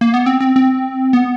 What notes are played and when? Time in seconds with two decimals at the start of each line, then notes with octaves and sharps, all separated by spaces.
0.01 A#3
0.14 B3
0.26 C4
0.40 C4
0.56 C4
1.13 B3